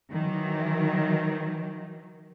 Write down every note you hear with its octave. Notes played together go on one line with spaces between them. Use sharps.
D#3 E3 F#3